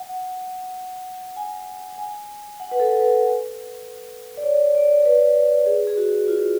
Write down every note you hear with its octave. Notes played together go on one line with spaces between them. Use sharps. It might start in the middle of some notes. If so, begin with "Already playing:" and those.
Already playing: F#5
G#5
G#5
F#5
B4
A4
B4
D5
C#5
D5
B4
G#4
G#4
F#4
F4